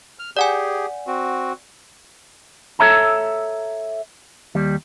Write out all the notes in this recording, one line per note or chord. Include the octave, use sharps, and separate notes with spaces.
F6
G4 G#4 D5 F#5 G#5
C4 F#4
A4 B4 C#5 E5 A5 A#5
D#2 G3